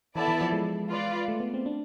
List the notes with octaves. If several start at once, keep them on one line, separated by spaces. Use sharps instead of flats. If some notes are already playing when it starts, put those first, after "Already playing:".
E3 B3 E4 A4 D5 A5
E3
F3
G#3
F4 B4 D5
A3
B3
C4
D4